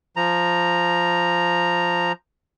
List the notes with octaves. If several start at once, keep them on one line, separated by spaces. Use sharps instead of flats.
F3 A#5